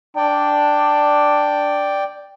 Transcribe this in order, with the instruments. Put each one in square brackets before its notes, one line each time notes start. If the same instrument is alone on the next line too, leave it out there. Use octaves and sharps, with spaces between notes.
[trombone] D4 [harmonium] D5 G5